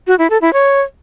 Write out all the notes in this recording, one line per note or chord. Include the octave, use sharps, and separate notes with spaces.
F#4
E4
A4
E4
C#5